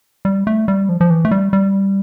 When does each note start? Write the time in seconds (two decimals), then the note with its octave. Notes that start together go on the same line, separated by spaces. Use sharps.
0.25 G3
0.47 A3
0.68 G3
0.89 F3
1.01 F3
1.10 E3
1.25 A3
1.31 G3
1.53 G3